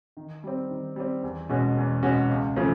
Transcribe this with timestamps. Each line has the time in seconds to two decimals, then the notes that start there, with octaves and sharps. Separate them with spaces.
0.17 D#3
0.44 G3 C4
0.70 D#3
0.96 G3 C4
1.23 E2
1.49 B2 G#3 C#4 F#4
1.77 E2
2.03 B2 G#3 C#4 F#4
2.30 C#2
2.56 C#3 F3 A3